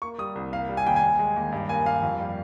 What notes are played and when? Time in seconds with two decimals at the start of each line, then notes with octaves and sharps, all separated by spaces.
0.02 A#3 C#6
0.18 G3 D#6
0.35 C2
0.52 A#3 F5
0.69 G3
0.77 G#5
0.86 D#2 G5
0.96 G#5
1.03 D#2
1.19 G#3
1.36 D#2
1.52 G2
1.69 A#3 G#5
1.86 G2 F5
2.02 F2
2.19 G3